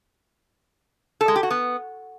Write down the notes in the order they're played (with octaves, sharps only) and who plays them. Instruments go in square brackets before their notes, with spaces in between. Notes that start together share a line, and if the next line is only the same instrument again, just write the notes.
[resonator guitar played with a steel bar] A4
G#3
G4
F#4
B3